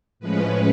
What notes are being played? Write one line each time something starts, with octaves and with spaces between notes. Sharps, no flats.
A2 F3 G#3 C#4 B4